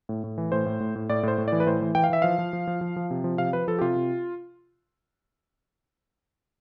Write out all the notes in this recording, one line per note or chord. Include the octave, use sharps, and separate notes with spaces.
A2
A2
E3
A2 C5
A2
A2
A2
A2 D5
A2 C5
A2
E3 D5
B4
A2 C5
E3
E3 G5
F5
E3 E5
F3 F5
F3
F3
F3
F3
F3
C3
F3
C3 F5
F3 B4
F3 A4
G4
C3 F4
C3